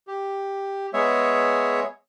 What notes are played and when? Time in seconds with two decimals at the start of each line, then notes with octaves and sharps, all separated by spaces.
0.07 G4
0.93 G#3 B3 G#4 C#5 E5